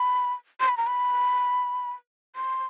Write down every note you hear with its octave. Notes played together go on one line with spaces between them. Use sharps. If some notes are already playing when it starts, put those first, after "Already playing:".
Already playing: B5
C6
B5
A#5
B5
C6